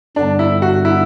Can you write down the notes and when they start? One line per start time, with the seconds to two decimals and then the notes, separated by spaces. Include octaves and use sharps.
0.16 G2 D3 G3 B3 D4
0.39 E4
0.62 F#4
0.85 E4